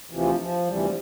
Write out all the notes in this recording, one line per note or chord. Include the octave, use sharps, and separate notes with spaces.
D2 C3 E3 F3
F3
D2 C3 E3 G3
F3